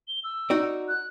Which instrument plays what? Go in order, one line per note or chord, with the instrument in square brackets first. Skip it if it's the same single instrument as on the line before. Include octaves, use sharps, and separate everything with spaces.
[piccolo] G7
E6
[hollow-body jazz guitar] D#4 F#4 D5
[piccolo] F#6